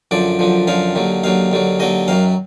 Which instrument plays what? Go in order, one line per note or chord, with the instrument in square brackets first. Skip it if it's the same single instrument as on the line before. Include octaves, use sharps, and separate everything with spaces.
[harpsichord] F#2 D3 F3 D5
F#2 D3 F3
F#2 D3 F3 F5
D#2 D3 F#3
D#2 D3 F#3 F5
D#2 D3 F#3
D#2 D3 F#3 D#5
F#2 D#3 F#3 F5